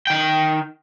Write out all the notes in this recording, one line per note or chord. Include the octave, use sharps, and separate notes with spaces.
D#3 G5